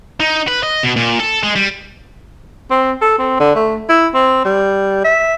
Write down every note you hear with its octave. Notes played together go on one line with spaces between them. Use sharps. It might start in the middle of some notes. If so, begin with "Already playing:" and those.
D#4
B4
D#5
B2
A#2
A4
G#3
G3
C4
A4
C4
D3
A3
E4
C4
G3
E5